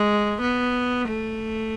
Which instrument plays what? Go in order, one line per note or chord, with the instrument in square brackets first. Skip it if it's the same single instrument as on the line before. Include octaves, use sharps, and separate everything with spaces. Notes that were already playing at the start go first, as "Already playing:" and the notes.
Already playing: [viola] G#3
B3
A3